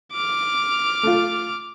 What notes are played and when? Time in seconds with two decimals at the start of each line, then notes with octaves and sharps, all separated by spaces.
0.13 D6 F6
1.03 A3 F4